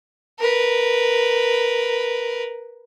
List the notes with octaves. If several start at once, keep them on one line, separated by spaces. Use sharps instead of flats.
A#4 B4